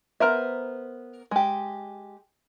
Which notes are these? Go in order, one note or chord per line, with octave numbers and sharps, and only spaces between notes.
B3 A#4 C5 E5
G#3 G4